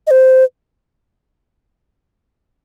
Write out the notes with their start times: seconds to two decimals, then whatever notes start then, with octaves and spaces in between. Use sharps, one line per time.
0.07 D#5
0.11 C5